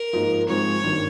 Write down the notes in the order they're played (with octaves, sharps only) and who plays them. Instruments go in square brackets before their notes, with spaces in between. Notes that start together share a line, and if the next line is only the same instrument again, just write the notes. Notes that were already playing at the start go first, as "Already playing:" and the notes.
Already playing: [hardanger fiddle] A#4
[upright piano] G#2 F3 A#3 D#4
[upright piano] G#2 F3 G#3 C4 [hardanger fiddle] C#5
[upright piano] G#1 G2 D#3 A#3